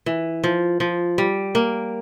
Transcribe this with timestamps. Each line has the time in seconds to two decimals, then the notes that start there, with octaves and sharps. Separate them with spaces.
0.06 E3
0.44 F3
0.80 F3
1.18 G3
1.55 A#3